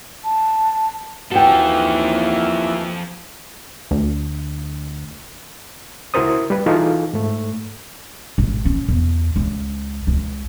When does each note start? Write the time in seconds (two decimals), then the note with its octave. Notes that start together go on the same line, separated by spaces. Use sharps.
0.24 A5
1.31 D#2 E3 F3 F#4 A4 G5
3.91 D2
6.14 C#2 E4 F#4 A#4 C5 D#6
6.50 G3 B4
6.66 E3 D#4 F4 G#4 A4 F5
7.13 G#2 A3
8.38 G#1
8.65 C#4
8.88 E2
9.36 C#2
10.07 C#2